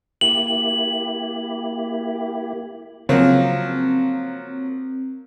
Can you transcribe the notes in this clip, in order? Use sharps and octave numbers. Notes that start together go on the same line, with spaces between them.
A#3 E4 G4 F#7
C#3 F3 F#3 A#3 C4